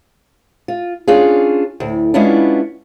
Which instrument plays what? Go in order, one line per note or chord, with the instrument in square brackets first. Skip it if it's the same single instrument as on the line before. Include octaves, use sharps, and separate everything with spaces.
[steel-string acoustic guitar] F4
C#4 D4 F4 G#4
D2 A2
G#3 B3 C#4 D4 E4 F4